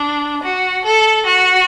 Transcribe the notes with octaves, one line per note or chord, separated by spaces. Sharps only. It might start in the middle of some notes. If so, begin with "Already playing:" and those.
Already playing: D4
F#4
A4
F#4